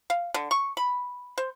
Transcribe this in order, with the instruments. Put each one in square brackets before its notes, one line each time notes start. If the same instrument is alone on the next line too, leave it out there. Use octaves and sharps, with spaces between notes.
[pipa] F5
D3
C#6
B5
C5